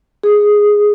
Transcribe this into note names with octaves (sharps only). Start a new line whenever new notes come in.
G#4